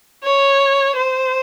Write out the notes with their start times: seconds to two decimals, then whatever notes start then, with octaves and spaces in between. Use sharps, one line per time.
0.24 C#5
0.96 C5